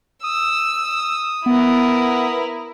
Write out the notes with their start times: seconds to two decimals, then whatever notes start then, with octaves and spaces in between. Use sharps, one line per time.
0.24 D#6 E6
1.46 B3 E4 A#4